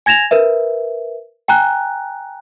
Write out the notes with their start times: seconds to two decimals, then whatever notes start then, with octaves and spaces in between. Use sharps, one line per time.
0.06 G#5 G#6 A#6 E7 F7
0.31 A#4 B4 E5
1.48 G5 G#5 A#5 F#6